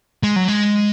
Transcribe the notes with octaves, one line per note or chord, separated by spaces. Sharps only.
G#3
F#3
G#3